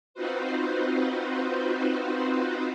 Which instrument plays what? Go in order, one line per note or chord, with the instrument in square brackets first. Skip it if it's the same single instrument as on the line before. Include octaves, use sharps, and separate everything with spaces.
[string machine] C4 D#4 F4 F#4 B4 C5